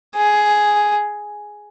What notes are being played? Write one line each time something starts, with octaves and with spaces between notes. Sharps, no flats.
G#4